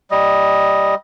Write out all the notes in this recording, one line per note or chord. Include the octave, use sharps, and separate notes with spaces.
G3 D#5